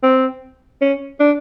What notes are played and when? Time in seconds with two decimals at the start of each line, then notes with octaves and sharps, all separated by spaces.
0.03 C4
0.81 C#4
1.20 D4